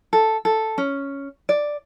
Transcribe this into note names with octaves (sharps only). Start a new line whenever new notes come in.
A4
A4
C#4
D5